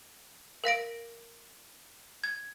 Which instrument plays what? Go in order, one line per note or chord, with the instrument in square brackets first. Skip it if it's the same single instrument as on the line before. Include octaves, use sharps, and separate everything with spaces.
[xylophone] A#4 F5 A#6 D7
G#6